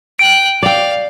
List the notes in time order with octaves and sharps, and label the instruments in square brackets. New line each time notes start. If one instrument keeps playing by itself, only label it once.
[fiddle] G5 F#6 [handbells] D7
[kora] D5 G5 [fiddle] F5